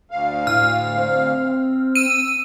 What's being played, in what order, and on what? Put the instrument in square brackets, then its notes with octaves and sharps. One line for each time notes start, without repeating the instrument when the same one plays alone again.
[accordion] D2 F5
[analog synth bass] A2 [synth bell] F6
[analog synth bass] C4
[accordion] E6 [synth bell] D#7